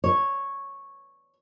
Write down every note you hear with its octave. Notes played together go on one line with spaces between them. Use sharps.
C#5